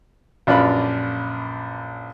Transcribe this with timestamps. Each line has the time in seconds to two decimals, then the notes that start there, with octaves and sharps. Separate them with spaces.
0.47 A#1 F#2 D4 F4 B4 B5